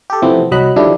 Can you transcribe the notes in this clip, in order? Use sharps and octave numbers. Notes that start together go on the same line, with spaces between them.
G4 A4
C3 E3 F3 A3 B3 C4
C2 F#3 D#5 B5 F#6
D3 D#3 F3 G3 D4 E4